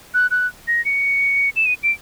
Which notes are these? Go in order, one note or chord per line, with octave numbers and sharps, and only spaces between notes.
F#6
F#6
A#6
C#7
E7
D#7
D7